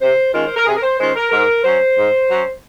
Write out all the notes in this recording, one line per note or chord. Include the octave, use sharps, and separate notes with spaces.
C3 C5
D#3 G#3 C#4 F4 A#4
C5
A#4
C3 G#4
A#4
C5
D#3 G#3 C#4 F4 C5
A#4
G#2 A#4
F#3 C#4 C5
G#2
F#3 C#4